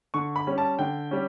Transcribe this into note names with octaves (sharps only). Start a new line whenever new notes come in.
D3 C#6
B5
G3 C#4
A5
D3 G5
G3 C#4